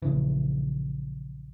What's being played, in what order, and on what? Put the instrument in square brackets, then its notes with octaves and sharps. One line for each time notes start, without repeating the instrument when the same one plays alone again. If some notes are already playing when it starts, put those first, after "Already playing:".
[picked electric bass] A#1 C#3 E3